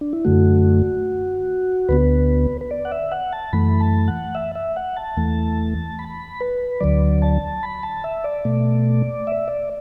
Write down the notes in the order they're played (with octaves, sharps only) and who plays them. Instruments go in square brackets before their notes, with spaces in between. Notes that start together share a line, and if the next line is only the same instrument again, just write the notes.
[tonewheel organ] D4
E4
F#2 D3 A3 F#4
D2 D3 B3 B4
B4
D5
F#5
E5
F#5
A5
F#2 E3 A3 B5
A5
F#5
E5
E5
F#5
A5
E2 E3 A3
B5
B4
D2 D3 F#3 D5
A5
B5
A5
E5
D5
B2 A3
E5
D5